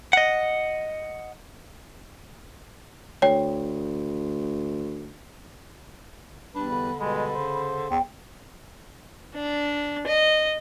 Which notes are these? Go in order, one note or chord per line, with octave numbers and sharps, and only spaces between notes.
D#5 F#5
D2 C#5 G5
E2 G3 D4 B4 B5
D3
B2 G3 G#3 B5
C#3 C5
E2 G5
D4
D#5